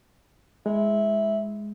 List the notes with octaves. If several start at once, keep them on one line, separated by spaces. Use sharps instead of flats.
G#3 E4